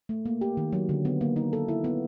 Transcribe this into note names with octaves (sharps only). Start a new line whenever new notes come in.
A3
A#3
G4
D#3
F#3
D3
B3
A#3
D#4
A4
E4
B3